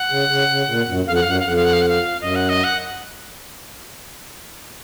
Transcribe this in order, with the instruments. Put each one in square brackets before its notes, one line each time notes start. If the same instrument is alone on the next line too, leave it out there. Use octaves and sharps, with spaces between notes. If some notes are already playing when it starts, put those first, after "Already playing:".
Already playing: [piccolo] F#5
[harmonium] C#3
C#3
C#3
A#2
F#2
[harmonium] F2 [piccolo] F5
[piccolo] F#5
[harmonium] F#2 [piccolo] F5
[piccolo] F#5
F5
[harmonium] F2 [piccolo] F#5
[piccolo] F5
F#5
F5
F#5
F5
[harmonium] F#2 [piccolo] D#5
[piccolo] F#5
D#5
F#5